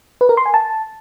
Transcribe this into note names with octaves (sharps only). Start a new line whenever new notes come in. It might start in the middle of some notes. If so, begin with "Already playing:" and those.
B4
A#4
C6
G#5
A5